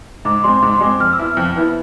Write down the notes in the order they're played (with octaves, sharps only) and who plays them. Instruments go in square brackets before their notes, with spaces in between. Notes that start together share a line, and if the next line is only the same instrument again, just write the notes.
[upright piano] G#2 [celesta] D6
[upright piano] G#3 C4 [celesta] C6
[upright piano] G#2 [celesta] D6
[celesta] C6
[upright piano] G#3 C4 [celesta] D6
[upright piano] F2 [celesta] F6
[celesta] E6
[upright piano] E3 B3 E4
[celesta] F6
[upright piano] F2
E3 B3 E4